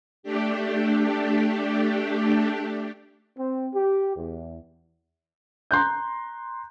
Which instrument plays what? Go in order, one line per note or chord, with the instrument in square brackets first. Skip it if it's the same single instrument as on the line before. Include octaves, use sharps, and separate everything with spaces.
[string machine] A3 D4 G4
[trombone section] C4
G4
E2
[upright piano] A#5 C6 F#6 G6